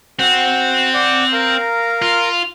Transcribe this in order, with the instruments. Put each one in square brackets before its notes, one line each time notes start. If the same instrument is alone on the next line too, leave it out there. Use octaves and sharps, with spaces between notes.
[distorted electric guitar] C4 [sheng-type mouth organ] F#4 F#5
[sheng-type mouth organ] D5 F#5
A#4 F5 A#5
[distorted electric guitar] F4